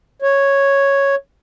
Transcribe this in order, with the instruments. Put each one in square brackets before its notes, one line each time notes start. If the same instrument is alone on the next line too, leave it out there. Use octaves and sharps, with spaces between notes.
[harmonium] C#5